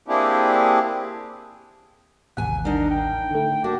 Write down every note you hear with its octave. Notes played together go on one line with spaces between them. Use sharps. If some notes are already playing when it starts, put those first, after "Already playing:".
A#3 C4 D4 E4 G4 G#4
A1 D#2 C3 F#5 G#5
D4 D#4 A#4
G5
D3 A3
A#3 D4 F#4